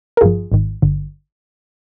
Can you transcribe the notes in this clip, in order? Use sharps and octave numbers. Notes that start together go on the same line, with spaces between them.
A#4
G1 G2 F3 F4 G#4
G#1 G#2 D#3
G#1 G2 D3